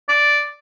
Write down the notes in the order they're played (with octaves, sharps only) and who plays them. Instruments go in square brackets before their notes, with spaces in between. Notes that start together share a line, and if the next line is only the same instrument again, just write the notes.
[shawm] D5